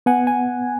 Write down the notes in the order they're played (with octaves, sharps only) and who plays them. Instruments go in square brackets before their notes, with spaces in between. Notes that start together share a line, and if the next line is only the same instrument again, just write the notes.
[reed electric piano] B3 [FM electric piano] F#5 G#5
[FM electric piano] G#5